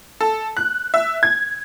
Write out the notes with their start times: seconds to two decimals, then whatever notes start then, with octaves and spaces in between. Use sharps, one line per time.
0.21 A4
0.57 F#6
0.94 E5
1.23 G#6